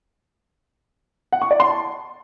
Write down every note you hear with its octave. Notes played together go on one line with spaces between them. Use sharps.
F#5
C#6
D5
C6
A5